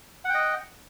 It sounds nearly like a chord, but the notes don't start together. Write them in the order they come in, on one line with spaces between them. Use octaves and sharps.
F#5 G5 D#5